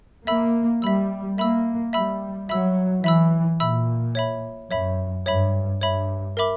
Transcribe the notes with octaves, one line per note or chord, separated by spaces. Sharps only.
A#3 E5 B5 E6
G3 E5 B5 E6
A#3 E5 B5 E6
G3 E5 B5 E6
F#3 E5 B5 E6
E3 E5 B5 E6
A#2 E5 B5 E6
C#5 E5 B5
F#2 C#5 E5 B5
G2 C#5 E5 B5
G2 C#5 E5 B5
A#4 E5 B5 D6